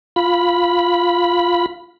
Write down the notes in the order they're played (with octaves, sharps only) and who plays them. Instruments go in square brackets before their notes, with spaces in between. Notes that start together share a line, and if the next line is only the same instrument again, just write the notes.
[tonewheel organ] F4 B5